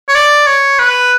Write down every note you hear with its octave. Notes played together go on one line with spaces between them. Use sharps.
C#5
D5
C#5
B4